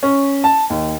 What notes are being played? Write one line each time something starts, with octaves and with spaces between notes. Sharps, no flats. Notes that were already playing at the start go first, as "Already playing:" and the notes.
C#4
A5
D#2